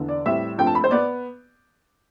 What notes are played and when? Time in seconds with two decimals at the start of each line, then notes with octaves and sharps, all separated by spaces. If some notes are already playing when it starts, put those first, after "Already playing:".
Already playing: E2 D3
0.09 D5
0.26 A2 G3 C4 E5
0.58 G2 F3 A3 C4 G5
0.67 A5
0.75 B5
0.84 C5
0.91 B3 D5